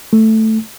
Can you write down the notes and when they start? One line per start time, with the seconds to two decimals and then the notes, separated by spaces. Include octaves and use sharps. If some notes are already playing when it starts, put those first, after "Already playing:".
0.13 A3